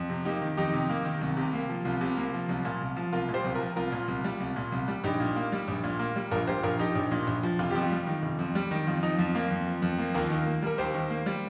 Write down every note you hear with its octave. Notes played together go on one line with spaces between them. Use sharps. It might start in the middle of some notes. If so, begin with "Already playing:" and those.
Already playing: F2
C3
A#3 D#4 G4
D#3
F2 D#4 G4
C3
A#3
D#3
C2
C3
A#3
F3
C2 F4
C3
A#3
F3
C2
A#2
C2
F3
C2 F4 A#4
A#2
G4 C5
C2
F4 A#4
F3
C2 F4 A#4
A#2
C2
G3
C2
A#2
C2
G3
A#1 D#4 G4
A#2
A#3
G3
A#1
A#2
A#3
G3
A#1 F4 A#4
A#2 G4 C5
A#1 F4 A#4
F3 D#4 G4
A#1
A#2
A#1
F3
F1 F4
F2 G4
F4
G3
D#3
F1
F2
G3
D#3
F2 F4
F3 D#4
F2 F4
A#3
F2
F3
F2
A#3
D#2 F4 A#4
D#3
A#3
G3 A#4
D#2 G4 C5
D#3
A#3
G3